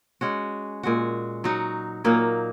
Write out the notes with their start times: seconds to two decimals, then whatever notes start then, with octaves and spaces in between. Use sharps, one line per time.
0.21 G#3 C#4 F#4
0.83 A#2 G#3 F#4
1.44 F#3 D#4 F#4
2.04 A#2 F#3 A#3 D#4